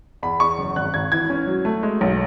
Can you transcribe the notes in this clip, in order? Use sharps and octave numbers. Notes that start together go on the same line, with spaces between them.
E2 B5
E2 C#6
F#1
G#1 F#6
G#1 G#6
E3 G#6
C#4
F#3
A3
G#3
B1